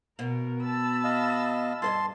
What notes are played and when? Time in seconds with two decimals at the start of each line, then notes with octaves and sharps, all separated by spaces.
0.19 B2 A#4
0.63 A5 B5 E6
1.04 D#5 F5
1.82 G2 B4 D#5 A5 C6